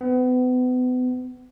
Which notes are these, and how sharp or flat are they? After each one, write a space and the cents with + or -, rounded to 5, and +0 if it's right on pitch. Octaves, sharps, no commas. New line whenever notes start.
B3 +35